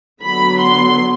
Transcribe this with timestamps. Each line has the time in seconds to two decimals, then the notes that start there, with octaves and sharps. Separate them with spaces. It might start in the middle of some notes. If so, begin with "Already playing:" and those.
0.22 D3 F#3 B3 B5
0.59 C6